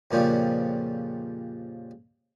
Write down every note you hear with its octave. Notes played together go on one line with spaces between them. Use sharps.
F2 A#2 C#3 F3 G3